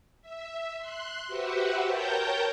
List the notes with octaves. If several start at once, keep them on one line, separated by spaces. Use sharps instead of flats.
E5
C6 F#6
F#4 G4 B4 C5 E5 F#5
A#4 C#5 G5 A5 G6 A#6